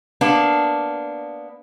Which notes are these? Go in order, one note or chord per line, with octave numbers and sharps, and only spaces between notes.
A#3 B3 D4